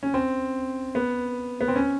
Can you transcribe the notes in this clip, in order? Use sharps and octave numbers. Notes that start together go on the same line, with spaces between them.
C#4
C4
B3
B3
C4
C#4